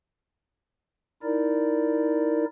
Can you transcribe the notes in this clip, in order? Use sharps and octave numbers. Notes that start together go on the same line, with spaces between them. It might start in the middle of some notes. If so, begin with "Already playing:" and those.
D#4 E4 A#4 D5